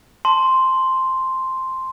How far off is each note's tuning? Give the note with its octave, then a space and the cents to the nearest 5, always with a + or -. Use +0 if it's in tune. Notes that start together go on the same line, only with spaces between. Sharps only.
A5 +0 C6 +0